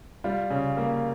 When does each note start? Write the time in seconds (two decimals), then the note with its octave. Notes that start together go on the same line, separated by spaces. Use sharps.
0.24 G3 F4
0.50 C#3
0.77 A#3